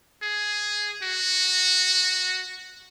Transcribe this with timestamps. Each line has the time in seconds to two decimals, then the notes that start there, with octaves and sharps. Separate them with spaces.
0.22 G#4
1.03 F#4